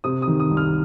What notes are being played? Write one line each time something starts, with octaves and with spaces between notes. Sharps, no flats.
C3 D#6
D#6
D#3
D#6
C2
F6